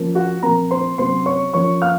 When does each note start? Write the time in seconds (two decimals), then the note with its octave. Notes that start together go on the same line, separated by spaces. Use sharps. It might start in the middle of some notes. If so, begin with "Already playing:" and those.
Already playing: F3 A#3 C#4
0.15 F#4 F#5
0.43 A#2 F3 C4 A#4 A#5
0.71 C5 C6
0.98 C3 F#3 C#4 C5 C6
1.26 C#5 C#6
1.53 F3 A#3 C#4 C#5 C#6
1.82 F5 F6